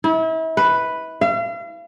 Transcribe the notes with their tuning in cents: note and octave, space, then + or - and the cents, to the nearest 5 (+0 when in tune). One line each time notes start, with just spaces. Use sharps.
E4 -35
B4 +0
F5 -40